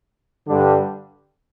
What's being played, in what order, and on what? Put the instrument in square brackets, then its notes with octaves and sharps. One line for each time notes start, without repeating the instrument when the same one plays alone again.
[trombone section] G2 D3 G3 D4